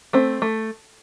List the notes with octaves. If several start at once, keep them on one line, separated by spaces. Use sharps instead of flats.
A3 C4
A3